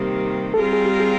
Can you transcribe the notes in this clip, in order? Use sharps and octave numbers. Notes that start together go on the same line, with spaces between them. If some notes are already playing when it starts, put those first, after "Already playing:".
Already playing: C3 D#3 G3 A#3 G4
A4
G3 C4 F4 G#4 A#4
G#4
G4
G#4